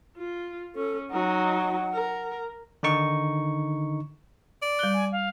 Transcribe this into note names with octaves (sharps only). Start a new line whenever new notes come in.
F4
C#4 A4
F#3 D#4 F#5
A#4
D3 D#3 D#4 C#6
D5
G3 F#6 G7
G#5
F5